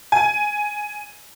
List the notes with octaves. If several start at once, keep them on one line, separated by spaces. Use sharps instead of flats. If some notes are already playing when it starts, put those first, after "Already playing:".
G#5